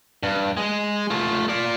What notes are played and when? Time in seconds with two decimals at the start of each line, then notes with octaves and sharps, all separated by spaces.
0.23 G2
0.57 G#3
1.10 A3 F4
1.49 F4 D5